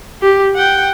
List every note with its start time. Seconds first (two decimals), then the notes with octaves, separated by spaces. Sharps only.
0.22 G4
0.55 F#5 G5